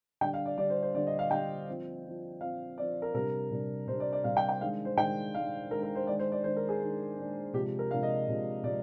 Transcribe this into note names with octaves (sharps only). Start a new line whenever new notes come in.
D3 G3 D4 G5
F5
D5
D3 G3 D4 D5
C5
C5
D3 G3 D4 D5
D#5
F5
D3 G3 D4 G5
F3 C4
F3 C4
F3 C4 F5
F3 C4 D5
A#4
C3 G3 D4 A#4
C3 G3 D4
C3 G3 D4 C5
D5
D5
C3 G3 D4 F5
G5
G5
D#3 G#3 D4 F5
C5
D#3 G#3 D4 G5
D#3 G#3 D4 F5
D#3 G#3 D4 A#4
A#4
C5
D#3 G#3 D4 D5
C5
D5
D#3 G#3 D4 C5
A#4
G#4
D#3 G#3 D4
D#3 G#3 D4
C3 F3 G#3 D4 G4
A#4
C3 F3 G#3 D4 F5
D#5
C3 F3 G#3 D4
C3 F3 G#3 D5